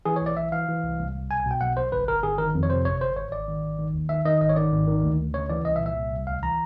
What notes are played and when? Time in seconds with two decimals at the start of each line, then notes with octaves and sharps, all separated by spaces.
0.06 E3 G#4
0.16 C#5
0.21 B1 D5
0.37 E3 E5
0.52 E3 F5
0.69 E3
0.84 C2
0.99 C2
1.15 C2
1.30 B1 G#5
1.40 G#5
1.46 B2 G5
1.61 B1 F#5
1.77 B1 C5
1.92 G1 B4
2.07 G1 A#4
2.23 G1 G#4
2.38 D#3 A#4
2.55 F2
2.63 C#5
2.70 C3 C5
2.85 G1 C#5
3.01 G1 C5
3.16 G#1 C#5
3.32 G#1 D5
3.48 D#3
3.63 G#1
3.79 D#3
3.94 D#2
4.09 D#3 E5
4.25 D#3 D#5
4.41 G#1 D#5
4.49 C#5
4.56 D#3 D5
4.72 G#1
4.88 D#3
5.03 D2
5.19 D2
5.34 C#3 C#5
5.50 E3 D5
5.65 C2 D#5
5.76 E5
5.81 A#2
5.86 E5
5.96 C2
6.12 C2
6.27 D2 F5
6.43 E3 A#5